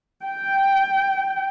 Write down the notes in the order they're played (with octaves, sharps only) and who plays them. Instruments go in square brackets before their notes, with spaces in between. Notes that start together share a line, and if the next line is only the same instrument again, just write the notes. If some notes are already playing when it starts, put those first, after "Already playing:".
[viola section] G5